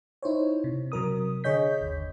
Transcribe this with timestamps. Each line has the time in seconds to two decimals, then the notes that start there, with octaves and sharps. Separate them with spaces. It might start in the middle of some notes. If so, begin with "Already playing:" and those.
0.23 D#4 E4 C5 C#5
0.64 C3
0.92 C3 F#3 A#4 D#6
1.44 D3 G#4 C#5 D#5 G6 B6
1.81 G1 D#2